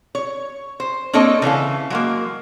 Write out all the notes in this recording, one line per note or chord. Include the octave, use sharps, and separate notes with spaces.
C#5
C5
A#3 C4 D4 A4 C#5 D#5
C#3 E3 A4 F5
F#3 G#3 A#3